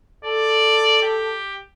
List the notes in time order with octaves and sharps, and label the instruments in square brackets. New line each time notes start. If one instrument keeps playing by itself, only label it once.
[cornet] A4 [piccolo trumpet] D5
[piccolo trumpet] G4